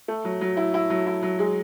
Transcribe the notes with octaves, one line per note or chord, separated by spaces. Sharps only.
A3
F#3
F#3
E4
E4
F#3
E4
F#3
G#3